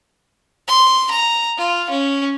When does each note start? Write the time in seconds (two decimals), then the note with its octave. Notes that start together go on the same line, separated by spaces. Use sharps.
0.68 C6
1.11 A#5
1.58 F4
1.90 C#4